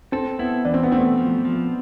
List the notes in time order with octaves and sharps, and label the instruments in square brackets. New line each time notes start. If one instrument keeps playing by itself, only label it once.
[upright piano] C4 [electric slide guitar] A4
[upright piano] B3 [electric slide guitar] E4
[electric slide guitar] E3 [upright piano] D4
[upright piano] C4
B3
[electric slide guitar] A3 [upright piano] C4
[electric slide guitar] F3
F3